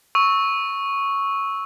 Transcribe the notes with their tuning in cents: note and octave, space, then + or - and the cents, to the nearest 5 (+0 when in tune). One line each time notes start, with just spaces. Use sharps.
C#6 +0 E6 -15